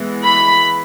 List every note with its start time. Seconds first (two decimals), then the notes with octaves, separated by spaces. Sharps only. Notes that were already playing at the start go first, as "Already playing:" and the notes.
Already playing: E3 G#3 B3
0.25 B5